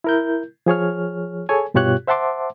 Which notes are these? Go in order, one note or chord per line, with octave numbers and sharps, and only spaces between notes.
E4 A#4 G6
F3 G#4 C#5 F6
G#4 A4 C#5 G#5
G2 B2 F4 G4 C#5 F#6
C5 E5 F#5 A5 C6 D6